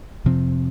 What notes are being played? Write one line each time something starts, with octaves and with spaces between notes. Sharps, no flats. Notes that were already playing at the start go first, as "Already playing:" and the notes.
F2 C3 F3 C4